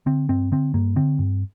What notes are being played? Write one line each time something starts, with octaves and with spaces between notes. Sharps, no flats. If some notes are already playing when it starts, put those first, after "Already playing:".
D3 C4
G2 C4
D3 C4
G2 A#3
D3 C4
G2